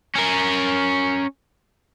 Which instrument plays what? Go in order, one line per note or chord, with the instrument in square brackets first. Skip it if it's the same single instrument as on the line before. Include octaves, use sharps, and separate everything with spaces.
[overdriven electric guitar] C#4 A#4